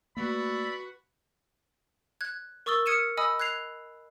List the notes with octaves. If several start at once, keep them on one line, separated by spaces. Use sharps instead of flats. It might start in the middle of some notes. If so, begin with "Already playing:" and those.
A3 A#3 F#4 B4 D5 B5 E6
F#6 G#6
A#4 C#6 D#6 E6 A6 G7
D#6 F6 G#6 C#7 D#7 E7
D#5 G#5 B5 D#6 E6
F#6 G#6 C7 F7